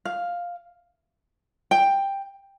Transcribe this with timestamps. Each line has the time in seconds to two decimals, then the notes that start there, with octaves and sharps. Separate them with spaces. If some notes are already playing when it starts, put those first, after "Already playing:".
0.05 F5
1.71 G5